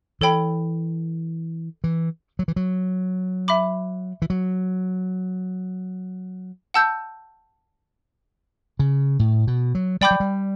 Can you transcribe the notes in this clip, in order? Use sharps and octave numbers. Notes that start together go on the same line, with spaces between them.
E3 A4 C#5 G5 B5
E3
F#3
E3
F#3
E5 B5 D6
E3
F#3
F#5 A5 E6 G6
C#3
A2
B2
F#3
G3 D5 G5 B5 D6 G6
F#3
G3